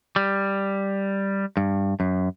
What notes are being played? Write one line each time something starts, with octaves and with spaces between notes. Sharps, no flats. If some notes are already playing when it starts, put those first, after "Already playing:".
G3
G2
F#2